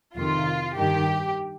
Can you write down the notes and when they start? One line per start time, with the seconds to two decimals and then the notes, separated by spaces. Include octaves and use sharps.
0.16 F2 C3 D#3 F4
0.76 G2 D#3 G4